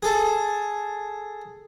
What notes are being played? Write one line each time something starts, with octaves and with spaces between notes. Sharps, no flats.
G#4 A4